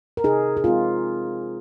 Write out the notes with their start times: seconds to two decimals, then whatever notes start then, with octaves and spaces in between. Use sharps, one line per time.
0.17 A#4
0.24 C3 D#4 G#4
0.57 G#4
0.64 G#3 C4 F4